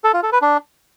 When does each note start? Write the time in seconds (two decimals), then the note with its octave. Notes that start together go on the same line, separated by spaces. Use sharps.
0.04 A4
0.14 F4
0.23 A4
0.32 B4
0.42 D4